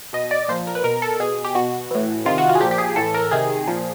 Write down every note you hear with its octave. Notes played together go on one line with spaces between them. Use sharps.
B2 D#5
D5
A#2 F3 C5
A#4
B4
B2 A#4
A4
B2 G#4
G4
B2 F#4
A2 E3
C3 D#3 F4
F#4
F4
G#4
A#2 F3 G4
G4
G#4
A2 E3 A4
A#4
C3 D#3 G#4
A#2 F3